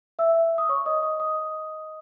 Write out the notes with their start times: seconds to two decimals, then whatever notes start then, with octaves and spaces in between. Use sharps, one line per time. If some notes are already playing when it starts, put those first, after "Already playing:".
0.19 E5 E6
0.58 D#6
0.69 C#5 C#6
0.86 D#5 D#6
1.03 D#5 D#6
1.20 D#5 D#6